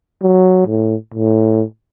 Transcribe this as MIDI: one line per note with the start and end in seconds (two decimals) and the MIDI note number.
0.23 0.63 54
0.67 0.95 45
1.14 1.64 45